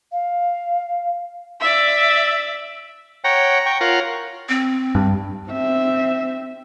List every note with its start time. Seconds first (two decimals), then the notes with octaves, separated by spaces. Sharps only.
0.12 F5
1.61 D5 E5
3.24 C#5 F#5 G5 A#5
3.66 G5 C#6
3.81 F4 A#4 C#5 F#5
4.49 C4
4.95 G2
5.49 C4 E5